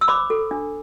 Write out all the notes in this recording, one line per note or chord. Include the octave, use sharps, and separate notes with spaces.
E6
C5 B5 D6
A4
D4